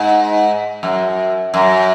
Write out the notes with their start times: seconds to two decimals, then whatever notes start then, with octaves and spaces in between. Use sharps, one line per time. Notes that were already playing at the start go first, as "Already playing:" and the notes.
Already playing: G#2
0.83 F#2
1.54 F#2